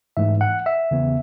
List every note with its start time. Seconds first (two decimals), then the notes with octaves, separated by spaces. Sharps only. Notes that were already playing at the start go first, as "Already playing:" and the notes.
0.17 G#2 E3 A3 E5
0.41 F#5
0.66 E5
0.91 E2 C#3 E3 B3